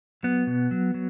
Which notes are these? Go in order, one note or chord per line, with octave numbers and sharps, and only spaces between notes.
F#3 B3
B2
F#3
F#3